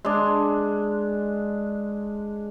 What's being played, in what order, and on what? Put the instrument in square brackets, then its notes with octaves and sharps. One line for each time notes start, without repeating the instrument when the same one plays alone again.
[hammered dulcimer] G#3 D4